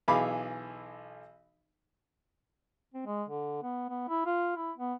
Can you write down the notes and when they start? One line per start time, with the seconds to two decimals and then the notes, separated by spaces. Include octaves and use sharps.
0.08 B1 E3 G#4 F5 B5 D6
2.94 C4
3.06 G#3
3.29 D3
3.63 B3
3.89 B3
4.08 E4
4.26 F4
4.57 E4
4.77 B3